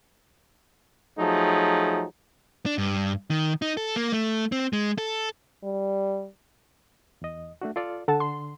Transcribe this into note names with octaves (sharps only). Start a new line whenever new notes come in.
F3 F#3 A3 D#4 G#4
D4
G2
D#3
D#4
A4
A#3
A3
C4
G#3
A4
G3
E2 D#5
A3 D4 F#4
F4 A4 D5
D3 A4 F#5 A5
C6